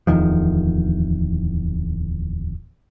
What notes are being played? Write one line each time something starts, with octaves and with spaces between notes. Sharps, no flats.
D1 E2 D#3 F3